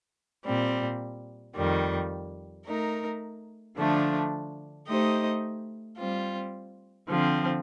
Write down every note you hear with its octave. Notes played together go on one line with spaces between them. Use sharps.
A#2 G3 C4
F2 D#3 G3
A3 D#4 A#4
D3 F3 A3 D4
A3 D#4 G4 C5 D#5
G3 C4 F4
D3 F3 C4